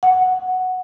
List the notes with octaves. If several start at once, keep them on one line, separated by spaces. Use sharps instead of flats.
F#5